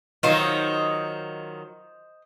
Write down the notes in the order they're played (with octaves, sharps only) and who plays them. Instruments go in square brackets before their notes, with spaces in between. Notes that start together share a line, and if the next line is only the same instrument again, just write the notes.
[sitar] D#3 F#3 F4 [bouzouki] C5 D#5